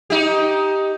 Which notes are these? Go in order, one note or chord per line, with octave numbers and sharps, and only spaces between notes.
D#4 G4